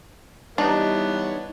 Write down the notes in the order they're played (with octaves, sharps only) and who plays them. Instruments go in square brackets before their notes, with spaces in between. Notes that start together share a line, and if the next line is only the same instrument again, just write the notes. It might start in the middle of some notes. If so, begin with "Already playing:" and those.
[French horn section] E3 G3 [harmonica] B3 C#5 [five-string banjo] D4 [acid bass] D#4